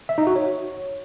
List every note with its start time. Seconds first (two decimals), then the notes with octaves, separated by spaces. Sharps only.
0.09 E5
0.18 D#4
0.27 F#4
0.36 C#5